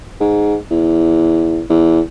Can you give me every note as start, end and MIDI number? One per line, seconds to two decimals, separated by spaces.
0.20 0.56 44
0.71 1.61 40
1.69 2.00 40